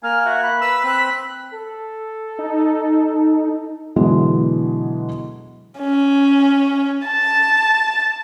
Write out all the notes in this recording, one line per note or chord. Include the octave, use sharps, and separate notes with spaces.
A#3 G#5 F6
F#4 E5
B5 F#6
B4 E6 B6
C4 F#6
A4
D#4
B2 D3 E3 F#3 G#3
C#4
A5